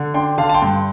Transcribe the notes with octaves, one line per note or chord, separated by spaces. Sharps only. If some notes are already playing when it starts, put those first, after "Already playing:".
Already playing: D3
D4 G5 C6
D3 F5 A5
A5
G5 C6
G2